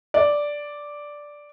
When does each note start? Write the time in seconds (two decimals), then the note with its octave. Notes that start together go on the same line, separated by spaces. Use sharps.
0.14 D5